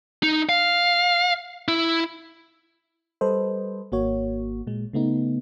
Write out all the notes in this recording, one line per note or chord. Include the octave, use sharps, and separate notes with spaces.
D#4
F5
E4
G3 A4 B4 C5 D#5
G#1 A#3 F#4 C#5
A#2 G#3
C#3 A3 B3 D#4